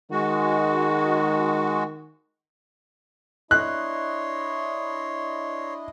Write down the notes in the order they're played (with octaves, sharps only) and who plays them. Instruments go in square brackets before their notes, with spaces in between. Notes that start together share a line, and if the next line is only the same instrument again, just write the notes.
[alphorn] D#3 [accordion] G#3 F#4
[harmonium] D4 E4 D#5 [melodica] C#5 C6 [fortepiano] F#6